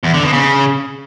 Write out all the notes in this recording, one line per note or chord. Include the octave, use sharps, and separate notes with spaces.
E2
D3
B2
C#3